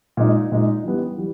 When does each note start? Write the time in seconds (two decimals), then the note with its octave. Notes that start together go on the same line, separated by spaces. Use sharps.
0.17 A#2 G#3 D#4
0.52 A#2 G#3 D#4
0.85 E3 G3 B3
1.18 E3 G3